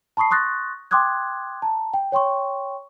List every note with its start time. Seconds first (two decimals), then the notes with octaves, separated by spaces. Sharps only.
0.17 A5 B5 C#6 D#6 C7
0.30 C6 C#6 D#6 F#6 A6 A#6
0.91 G5 C6 D6 D#6 F#6 G#6
1.62 A5 A#5
1.94 G5
2.12 C#5 G5 C6 C#6